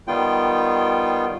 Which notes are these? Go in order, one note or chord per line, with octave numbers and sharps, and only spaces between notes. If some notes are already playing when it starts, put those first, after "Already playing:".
D#3 G3 B3 F4 G5